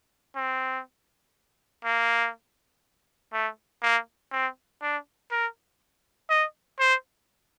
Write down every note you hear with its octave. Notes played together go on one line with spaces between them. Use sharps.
C4
A#3
A3
A#3
C4
D4
A#4
D#5
C5